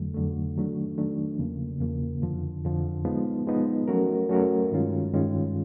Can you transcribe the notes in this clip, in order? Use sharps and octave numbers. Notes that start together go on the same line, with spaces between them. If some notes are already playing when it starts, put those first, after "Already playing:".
Already playing: F2 D3 F#3 A3
F2 D3 F#3 A3
D#3 F#3 A3 D4
D#3 F#3 A3 D4
E2 C#3 F3 A#3
E2 C#3 F3 A#3
F2 D3 F3
F2 D3 F3
F3 G#3 B3 D#4
F3 G#3 B3 D#4
F#3 A3 C#4 F#4 A#4
F#3 A3 C#4 F#4 A#4
G2 D#3 G#3 C#4 F4
G2 D#3 G#3 C#4 F4